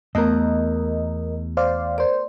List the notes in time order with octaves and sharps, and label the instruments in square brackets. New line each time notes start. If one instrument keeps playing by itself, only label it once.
[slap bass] E2 [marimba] A3 B3 [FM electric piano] A#4 D#5
[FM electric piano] C5 D5 F5
[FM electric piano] A#4 C5 [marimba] D5